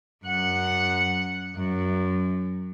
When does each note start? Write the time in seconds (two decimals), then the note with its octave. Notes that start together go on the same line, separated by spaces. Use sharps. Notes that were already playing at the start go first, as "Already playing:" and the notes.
0.25 F#2 F#5
1.56 F#2